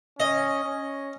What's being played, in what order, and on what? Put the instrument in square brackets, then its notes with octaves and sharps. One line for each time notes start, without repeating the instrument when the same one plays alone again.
[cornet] C#4 [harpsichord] D#5
[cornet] C#4